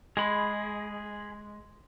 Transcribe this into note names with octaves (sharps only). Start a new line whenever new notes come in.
G#3 G#4 B5